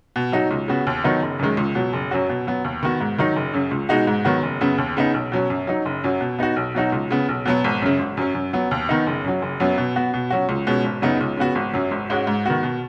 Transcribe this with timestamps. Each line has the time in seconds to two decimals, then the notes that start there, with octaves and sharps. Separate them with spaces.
0.16 B2
0.32 F#3 D#4 F#4
0.51 C#2
0.68 C#3 B3 F#4
0.87 D#2
1.04 D#3 F#3 B3 D#4
1.22 F#1
1.39 F#2 D#3 G#3
1.57 C#2
1.75 B2 F#3
1.93 F#1
2.11 F#2 F#3 C#4 F#4
2.29 B2
2.47 F#3 B3
2.64 D#2
2.83 D#3 B3 F#4
3.00 G#2
3.18 D#3 F#3 D#4
3.36 F#1
3.53 F#2 C#3
3.71 C#2
3.89 B2 G#3 D#4 F#4
4.07 G#2
4.25 D#3 F#3 B3 F#4
4.43 F#1
4.61 F#2 C#3 B3
4.78 D#2
4.97 C#3 B3 D#4
5.14 B1
5.32 B2 F#3 C#4
5.50 F#2
5.67 F#3 D#4
5.85 F#1
6.04 F#2 F#3
6.21 B2
6.39 B3 D#4 F#4
6.56 B1
6.75 B2 F#3 D#4 F#4
6.92 C#2
7.11 C#3 B3
7.29 B1
7.46 B2 F#3 B3
7.64 G#1
7.82 F#2 C#3
7.99 G#1
8.17 F#2 F#3 C#4
8.35 F#2
8.53 F#3 B3
8.71 D#2
8.89 D#3 B3 D#4
9.07 F#1
9.24 F#2 F#3
9.42 F#1
9.60 F#2 F#3 B3
9.78 B2
9.96 B3 F#4
10.14 B2
10.30 F#3 C#4 F#4
10.49 C#2
10.67 B2 G#3 C#4
10.84 G#1
11.02 F#2 C#3 B3 D#4
11.21 C#2
11.37 C#3 B3 F#4
11.55 G#1
11.74 F#2 F#3
11.91 G#1
12.10 G#2 G#3 C#4 F#4
12.27 G#2
12.46 D#3 B3 F#4
12.63 B2